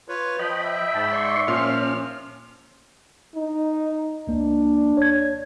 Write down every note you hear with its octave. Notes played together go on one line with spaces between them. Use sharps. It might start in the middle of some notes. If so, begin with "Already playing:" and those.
F4 B4 C#5
F3 D#5 G5 B5
E5
G#2 G5 A5 B5
D5 C6 C#6
A#2 F3 C#4 C6 F6
D#4
C#2 A#3 D4
C#5 G#6